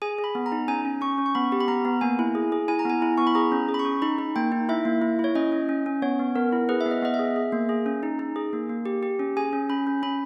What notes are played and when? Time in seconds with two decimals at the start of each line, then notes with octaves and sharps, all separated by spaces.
0.02 G#4 G#5
0.18 G#4
0.24 B5
0.35 B3
0.46 A#5
0.52 D#4
0.68 C#4 G#5
0.85 C#4
1.01 C#4 C#6
1.18 C#4
1.26 C#6
1.35 B3 B5
1.52 G4
1.60 B5
1.68 B3 A#5
1.85 B3
2.01 A#3 G#5
2.19 E4
2.35 G#4
2.52 G#4
2.68 E4 G#5
2.79 A#5
2.85 B3 G#5
3.02 E4
3.18 B3 C#6
3.27 B5
3.35 G#4 A#5
3.52 C#4
3.69 G#4
3.74 B5
3.79 C#6
3.85 C#4
4.02 D#4 B5
4.18 D#4
4.36 A#3 G5
4.52 D#4
4.69 E4 E5
4.85 A#3
5.02 E4
5.19 E4 C#5
5.35 C#4 D#5
5.52 C#4
5.69 C#4
5.86 C#4
6.02 B3 C#5
6.19 B3
6.35 B3 A#4
6.53 E4
6.69 G#4 B4
6.81 E5
6.86 B3
6.91 D#5
7.02 B3 D#5
7.14 E5
7.19 G#4
7.36 G#4
7.52 A#3
7.69 G#4
7.86 C#4
8.03 D#4
8.19 D#4
8.36 G#4
8.53 A#3
8.70 A#3
8.86 G4
9.03 G4
9.19 C#4
9.37 G#4 G#5
9.53 C#4
9.69 C#4 B5
9.87 C#4
10.03 C#4 B5